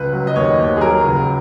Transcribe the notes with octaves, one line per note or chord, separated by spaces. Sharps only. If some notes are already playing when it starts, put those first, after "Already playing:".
Already playing: C#2 B4
F#3
D#5
D#2 C#5
D#2
G#4
F#3 A#4
C#2